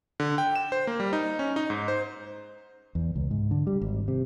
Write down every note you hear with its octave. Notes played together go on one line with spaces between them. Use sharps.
D3
G5
E7
C5
A#3
G3
D#4
C#4
D#4
G#2
C5
E2
C#2
G#2
D3
G3
G#1
C3